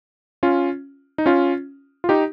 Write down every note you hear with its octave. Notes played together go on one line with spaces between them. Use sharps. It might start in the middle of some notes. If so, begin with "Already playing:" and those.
C#4 F4
D#4
C#4 F4
F4
D#4 G4